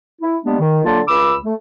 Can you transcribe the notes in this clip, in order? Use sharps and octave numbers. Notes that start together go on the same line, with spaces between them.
E4
G3 G#3 A#3 B3 D4
D#3
D3 F#3 A#3 F4 A5
C#2 B5 D6 E6
A3